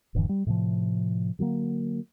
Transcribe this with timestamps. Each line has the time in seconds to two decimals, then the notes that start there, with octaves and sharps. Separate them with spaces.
0.15 D#1 G2 D3 E3
0.29 G3
0.46 A2 C3 E3 F3
1.39 D3 F#3 G#3 A#3